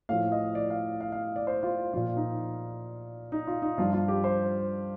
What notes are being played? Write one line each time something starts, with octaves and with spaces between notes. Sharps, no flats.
A2 F3 F5
D#5
D5
F5
F5
F5
D5
C5
F4
A#2 F3 F4
D#4
D#4
F4
D#4
G2 F3 F4
F4
G4
C5